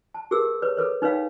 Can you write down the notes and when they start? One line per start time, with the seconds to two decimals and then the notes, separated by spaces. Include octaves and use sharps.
0.14 A5
0.31 G4 G#4 A#4 B4 E6
0.62 B4 C#5
0.77 G#4 A4 B4 C#5
1.02 D#4 B4 C#5 F5 G5